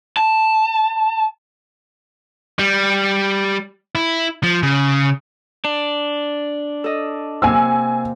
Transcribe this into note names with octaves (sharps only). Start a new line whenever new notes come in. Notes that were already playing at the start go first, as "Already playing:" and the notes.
A5
G3
E4
F3
C#3
D4
A4 D#5
C3 A#3 G#5 E6